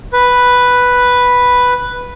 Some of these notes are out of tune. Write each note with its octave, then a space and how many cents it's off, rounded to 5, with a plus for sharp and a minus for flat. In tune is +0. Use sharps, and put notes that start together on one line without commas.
B4 +0